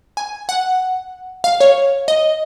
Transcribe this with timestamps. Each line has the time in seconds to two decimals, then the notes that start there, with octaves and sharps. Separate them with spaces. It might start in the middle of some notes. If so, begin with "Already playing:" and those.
0.17 G#5
0.49 F#5
1.44 F5
1.60 C#5
2.08 D#5